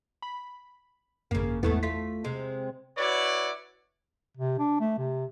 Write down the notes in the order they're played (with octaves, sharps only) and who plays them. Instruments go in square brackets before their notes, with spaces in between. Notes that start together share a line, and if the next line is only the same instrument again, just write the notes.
[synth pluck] B5
[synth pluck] G#1 F#2 [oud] C#3 A#3
[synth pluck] E2 E4 [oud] G#2 A3 B3
[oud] A3 F4 [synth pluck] B6
[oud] C3 G#3
[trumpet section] E4 F#4 B4 C#5 D5
[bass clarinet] C3
D4
A3
C3